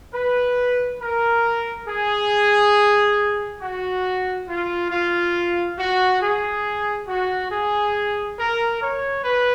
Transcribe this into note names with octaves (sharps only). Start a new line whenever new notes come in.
B4
A#4
G#4
F#4
F4
F4
F#4
G#4
F#4
G#4
A#4
C#5
B4